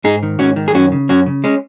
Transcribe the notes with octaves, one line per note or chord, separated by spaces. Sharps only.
G#2 D#4 G#4
D#3
G#2 C#4 F#4
D#3
G#4
F#2 C#4 F#4
C#3
F#2 C#4 F#4
C#3
G#3 C#4